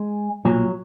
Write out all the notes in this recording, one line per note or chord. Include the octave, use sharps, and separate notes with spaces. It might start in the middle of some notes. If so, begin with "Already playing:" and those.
Already playing: G#3
B1 A#2 F#3